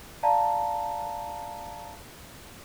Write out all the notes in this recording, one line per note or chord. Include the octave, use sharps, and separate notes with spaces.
D5 F5 A5 A#5